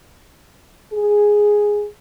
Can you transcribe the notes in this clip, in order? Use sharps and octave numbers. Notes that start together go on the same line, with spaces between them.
G#4